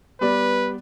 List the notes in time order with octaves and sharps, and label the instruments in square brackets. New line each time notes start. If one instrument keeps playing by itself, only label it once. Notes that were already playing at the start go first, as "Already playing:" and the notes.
[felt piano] G3 B3 D5 [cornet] B4